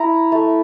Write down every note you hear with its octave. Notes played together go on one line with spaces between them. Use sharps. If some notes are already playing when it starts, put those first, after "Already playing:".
Already playing: E4 A#5
A3